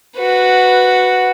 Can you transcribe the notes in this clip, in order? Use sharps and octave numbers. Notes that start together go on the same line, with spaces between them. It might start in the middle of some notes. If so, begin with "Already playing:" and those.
F#4 B4